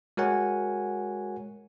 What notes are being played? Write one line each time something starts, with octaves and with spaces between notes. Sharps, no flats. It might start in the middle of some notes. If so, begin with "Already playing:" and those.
G#3 F#4 A#4 C#5 F#5 G#5